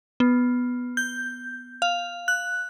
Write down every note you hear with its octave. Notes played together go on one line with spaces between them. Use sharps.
B3
G6
F5
F#6